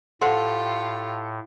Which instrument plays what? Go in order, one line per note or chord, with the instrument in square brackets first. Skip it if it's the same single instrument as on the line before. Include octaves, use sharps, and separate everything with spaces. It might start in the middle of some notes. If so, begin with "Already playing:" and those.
[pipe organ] A2 [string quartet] F4 G4 [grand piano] A4 [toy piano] C5 F#5 C6